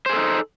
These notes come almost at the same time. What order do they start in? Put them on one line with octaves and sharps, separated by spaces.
C5 G#4 A4 D#4